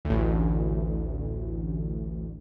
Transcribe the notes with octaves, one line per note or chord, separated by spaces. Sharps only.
A1 D2